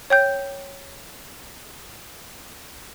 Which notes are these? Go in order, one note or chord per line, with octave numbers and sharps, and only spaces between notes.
C#5 G5 G6